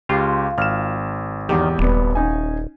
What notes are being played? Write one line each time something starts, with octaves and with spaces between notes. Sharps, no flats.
C#2 F4 G4
G#1 F6 E7
E1 E2 D#3 G4
D#1 G3 B3
C#4 D#4 G#5